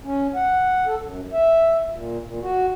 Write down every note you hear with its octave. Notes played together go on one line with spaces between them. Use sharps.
C#4
F#5
A4
F#2
E5
A#2
A#2
F#4